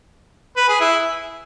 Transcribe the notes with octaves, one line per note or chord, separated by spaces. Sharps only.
B4
G#4
E4